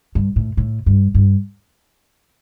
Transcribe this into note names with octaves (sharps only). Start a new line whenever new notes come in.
G2
A2
A2
G2
G2